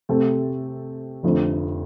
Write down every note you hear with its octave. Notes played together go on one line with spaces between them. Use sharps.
C3 A3 C4 A4
F1 F2 D3 A3